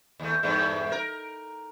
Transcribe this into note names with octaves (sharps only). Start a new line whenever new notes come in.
D#2 A3
E2 G2 A3
A#4